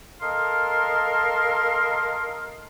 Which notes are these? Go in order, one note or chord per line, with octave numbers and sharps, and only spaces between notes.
A4 A#4 D#5 F5 C6